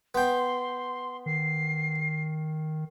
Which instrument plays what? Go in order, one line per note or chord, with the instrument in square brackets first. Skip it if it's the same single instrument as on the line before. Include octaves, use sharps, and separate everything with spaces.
[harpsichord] B3 G5 [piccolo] C6
[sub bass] D#3 [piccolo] C7